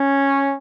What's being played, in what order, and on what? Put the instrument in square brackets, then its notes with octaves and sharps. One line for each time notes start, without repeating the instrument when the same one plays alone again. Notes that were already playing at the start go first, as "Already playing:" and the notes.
Already playing: [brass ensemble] C#4